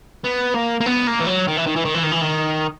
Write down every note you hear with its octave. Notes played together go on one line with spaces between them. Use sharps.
B3
A#3
A#3
B3
A#3
E3
F#3
D#3
E3
D#3
E3
D#3
E3
D#3
E3
D#3